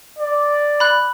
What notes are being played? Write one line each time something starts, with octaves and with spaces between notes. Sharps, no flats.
D5
B5 F#6